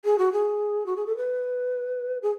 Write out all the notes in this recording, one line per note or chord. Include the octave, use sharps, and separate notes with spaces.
G#4
F#4
G#4
F#4
G#4
A4
B4
G#4